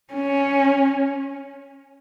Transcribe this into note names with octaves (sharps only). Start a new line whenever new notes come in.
C#4